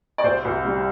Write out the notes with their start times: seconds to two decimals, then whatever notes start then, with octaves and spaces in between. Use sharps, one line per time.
0.18 D5
0.23 C2 C5
0.45 C2
0.65 G3